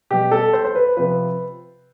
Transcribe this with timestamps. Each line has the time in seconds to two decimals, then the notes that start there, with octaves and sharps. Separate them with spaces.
0.10 B2 G3 G4
0.32 A4
0.53 C5
0.65 C5
0.75 B4
0.97 C3 F3 B4